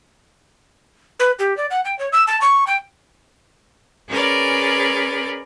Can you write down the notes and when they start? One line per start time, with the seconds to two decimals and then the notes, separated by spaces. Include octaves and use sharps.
1.20 B4
1.39 G4
1.57 D5
1.71 F#5
1.85 G5
1.99 C#5
2.12 E6
2.27 A5
2.41 C#6
2.67 G5
4.09 C#4 G#4 A#4 B4 D5